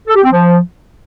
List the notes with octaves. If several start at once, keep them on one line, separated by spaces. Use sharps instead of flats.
A4
G4
C4
F3